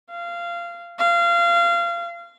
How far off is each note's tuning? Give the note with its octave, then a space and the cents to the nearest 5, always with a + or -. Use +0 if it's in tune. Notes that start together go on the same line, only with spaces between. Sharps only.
F5 -20
F5 -25